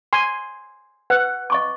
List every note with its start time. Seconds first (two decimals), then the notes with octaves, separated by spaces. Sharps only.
0.13 G#5 C6
1.10 B4 F#5
1.50 D#5 C#6 D6